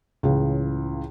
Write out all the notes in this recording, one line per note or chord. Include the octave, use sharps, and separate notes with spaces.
C#2 A2 C#3 E3